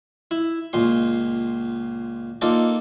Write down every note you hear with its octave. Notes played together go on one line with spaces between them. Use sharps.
E4
C#2 A#2 C6
A#3 D#4 F4 A4 D5